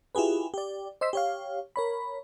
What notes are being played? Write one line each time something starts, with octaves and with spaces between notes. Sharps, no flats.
E4 F4 G4 G#4 B4
G4 D5
C5 D#5 C6 E6 B6
G4 C#5 F5
A#4 C#5 B5